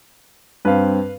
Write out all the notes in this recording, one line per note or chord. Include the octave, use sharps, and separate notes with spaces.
G2 C4 B4 F5